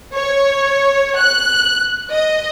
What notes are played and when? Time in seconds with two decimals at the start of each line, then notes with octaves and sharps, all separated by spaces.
0.16 C#5
1.18 F#6
2.11 D#5